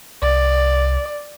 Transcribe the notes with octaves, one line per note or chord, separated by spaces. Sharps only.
C2 D5